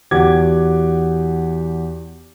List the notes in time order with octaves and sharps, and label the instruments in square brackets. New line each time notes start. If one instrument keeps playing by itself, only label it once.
[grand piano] E2 F#4 G4 F#5 D6 G#6